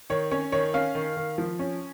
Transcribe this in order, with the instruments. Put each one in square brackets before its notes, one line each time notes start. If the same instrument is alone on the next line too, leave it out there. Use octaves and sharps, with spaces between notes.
[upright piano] D#3 C#5
C#4 C#5
D#3 C#5
C#4 F5
D#3
D#3
F3
C#4